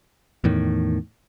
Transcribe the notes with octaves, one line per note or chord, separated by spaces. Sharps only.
E2 A2 D#3